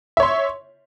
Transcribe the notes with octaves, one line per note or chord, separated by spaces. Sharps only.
C#5 E5 C6